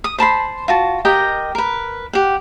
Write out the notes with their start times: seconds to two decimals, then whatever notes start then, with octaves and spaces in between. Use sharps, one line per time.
0.04 D#6
0.18 C5 A5 B5 C6
0.68 F4 F#4 A5
1.05 G4 A#4 D#5 G5
1.55 A#4 B4
2.13 G4 F#5